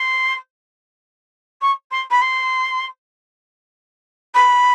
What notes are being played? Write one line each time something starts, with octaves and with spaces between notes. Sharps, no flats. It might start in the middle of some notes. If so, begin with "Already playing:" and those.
Already playing: C6
C#6
C6
B5
C6
B5